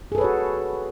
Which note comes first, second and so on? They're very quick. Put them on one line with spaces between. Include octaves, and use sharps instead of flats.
G#4 A4 B4 C#5 F#4